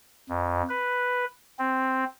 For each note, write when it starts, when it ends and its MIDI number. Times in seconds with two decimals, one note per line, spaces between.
0.29 0.62 41
0.69 1.25 71
1.59 2.05 60